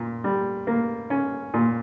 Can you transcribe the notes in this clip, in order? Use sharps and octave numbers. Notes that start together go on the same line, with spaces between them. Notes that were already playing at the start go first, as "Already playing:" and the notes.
Already playing: A#2
G3
A#3
C#4
A#2